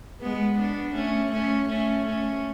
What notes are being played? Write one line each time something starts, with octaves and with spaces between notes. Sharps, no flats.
G#3 B3
B3 D4
A3 C#4
A3 C#4
A3 C#4
A3 C#4